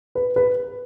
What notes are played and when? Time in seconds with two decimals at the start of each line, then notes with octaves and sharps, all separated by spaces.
0.15 B4
0.36 B4